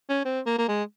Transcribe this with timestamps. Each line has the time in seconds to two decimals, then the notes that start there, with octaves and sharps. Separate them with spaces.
0.09 C#4
0.25 C4
0.46 A#3
0.58 A#3
0.68 G#3